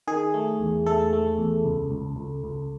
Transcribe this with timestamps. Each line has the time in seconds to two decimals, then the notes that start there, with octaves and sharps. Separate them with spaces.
0.07 D#3 G#4
0.34 A3
0.60 E2
0.86 A3 A4
1.13 A3
1.38 E2
1.65 C#2
1.90 C#2
2.16 C#2
2.44 C#2